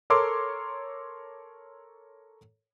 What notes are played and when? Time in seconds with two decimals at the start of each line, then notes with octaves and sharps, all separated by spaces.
0.10 A4 A#4 C#5 C6 D6 E6